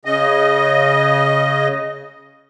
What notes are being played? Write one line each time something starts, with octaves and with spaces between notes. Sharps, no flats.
C#3 D#5